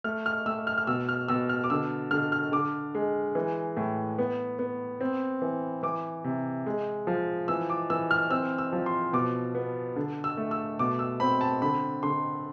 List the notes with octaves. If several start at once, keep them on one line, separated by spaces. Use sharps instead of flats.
A3 F6
F6
A3 E6
F6
F6
B2 E6
F6
B2 E6
F6
D6
D3 E6
D3 F6
F6
D3 D6
G#3
E3
A2
B3
B3
C4
E3
E3 D6
C3
G#3
F3
E3 E6
D6
E3 E6
F6
C4 E6
E6
F3
C6
B2 D6
B3
D3
E6
A3
E6
B2 D6
E6
C4 B5
A5
D3 B5
D3 C6